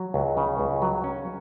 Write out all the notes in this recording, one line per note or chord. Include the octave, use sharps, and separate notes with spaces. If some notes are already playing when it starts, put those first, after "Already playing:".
Already playing: F#3
C#2
C#3
C#2
F#3
C#4